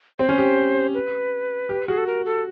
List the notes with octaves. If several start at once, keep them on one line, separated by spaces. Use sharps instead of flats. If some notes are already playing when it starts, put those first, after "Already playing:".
C4 C5
C#4
G4
B4
G4
F#4 G#4
A4
A#4
A4